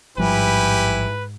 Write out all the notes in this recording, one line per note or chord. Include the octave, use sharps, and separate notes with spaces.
A1 G#2 F3 G3 E4 G4 B4 G#5